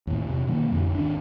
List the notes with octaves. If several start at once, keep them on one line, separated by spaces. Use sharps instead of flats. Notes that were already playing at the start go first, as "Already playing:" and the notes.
D#2 A2
E2 C3
B2 D#3 F#3 A#3
A1 F2 B2 D3
G#1 D#2 D4